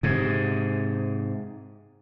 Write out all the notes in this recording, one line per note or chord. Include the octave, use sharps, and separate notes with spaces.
G#2 C3